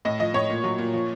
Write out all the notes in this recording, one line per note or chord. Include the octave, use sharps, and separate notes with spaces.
A2 D#5
F3 D#5
A2 C#5
A#2
F#3
A#2
F3